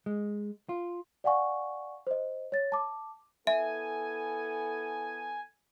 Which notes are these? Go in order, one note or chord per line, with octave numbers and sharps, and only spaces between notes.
G#3
F4
D5 F5 F#5 G#5 C#6
C5 D#5
C#5 A6
A5 D6
B3 E4 A4 E5 G#5